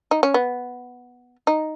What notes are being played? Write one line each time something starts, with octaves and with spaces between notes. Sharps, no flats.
D#4
C#4
B3
D#4